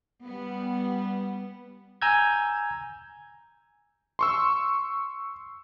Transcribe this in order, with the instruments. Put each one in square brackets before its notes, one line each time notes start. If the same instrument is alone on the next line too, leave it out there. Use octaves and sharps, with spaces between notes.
[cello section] G3 B3
[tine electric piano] G#5 A#5 E6 G6 G#6
[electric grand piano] C6 C#6 E6